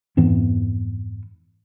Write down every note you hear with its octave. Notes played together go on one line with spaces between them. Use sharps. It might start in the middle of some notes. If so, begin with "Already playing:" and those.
F2 G#2 E3 B3